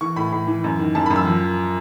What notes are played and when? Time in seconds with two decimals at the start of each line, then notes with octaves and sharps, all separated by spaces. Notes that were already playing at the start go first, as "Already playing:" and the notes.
0.01 E3 C#6
0.16 A2 B5
0.32 A2
0.47 E3
0.64 F#2
0.79 D#3
0.95 F#2 A5
1.06 B5
1.11 F#2
1.16 E6
1.26 F3